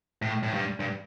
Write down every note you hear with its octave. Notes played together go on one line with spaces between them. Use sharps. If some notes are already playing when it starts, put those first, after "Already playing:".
A2
A2
G2
G2